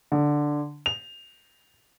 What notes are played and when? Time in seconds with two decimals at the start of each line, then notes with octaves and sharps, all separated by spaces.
0.12 D3
0.86 F7